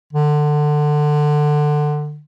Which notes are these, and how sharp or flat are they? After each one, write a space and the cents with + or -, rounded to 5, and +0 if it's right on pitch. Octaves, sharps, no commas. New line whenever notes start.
D3 +20